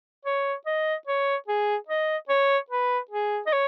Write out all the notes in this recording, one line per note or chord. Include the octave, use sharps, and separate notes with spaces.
C#5
D#5
C#5
G#4
D#5
C#5
B4
G#4
D#5
C#5